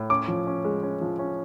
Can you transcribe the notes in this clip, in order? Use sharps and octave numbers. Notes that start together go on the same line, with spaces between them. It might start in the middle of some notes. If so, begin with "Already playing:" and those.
Already playing: A2
C#4 D6
F3
C#4
G#3
C#4
F3
C#4